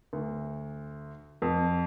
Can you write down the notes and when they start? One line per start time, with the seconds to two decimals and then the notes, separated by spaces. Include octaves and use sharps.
0.13 D2
1.42 F2